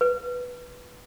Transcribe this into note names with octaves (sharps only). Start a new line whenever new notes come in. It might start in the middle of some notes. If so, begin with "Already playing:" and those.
B4